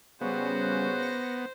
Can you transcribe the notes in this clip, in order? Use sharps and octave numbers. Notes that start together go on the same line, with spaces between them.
C#3 G3 B3 C#4 F#4 C5
A#6 C#7